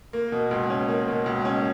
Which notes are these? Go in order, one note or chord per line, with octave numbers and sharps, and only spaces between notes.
A#3
B2
C#2
C#4
A#3
B2
C#2
C#4